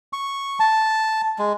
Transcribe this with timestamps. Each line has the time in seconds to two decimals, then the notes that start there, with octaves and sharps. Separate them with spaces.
0.13 C#6
0.60 A5
1.39 G#3